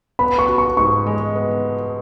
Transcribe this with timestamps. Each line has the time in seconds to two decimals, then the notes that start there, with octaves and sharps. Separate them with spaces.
0.19 B3 B5
0.39 C#6
0.48 F#4
0.58 C#6
0.77 G#2 C#6
1.06 G#3
1.35 B3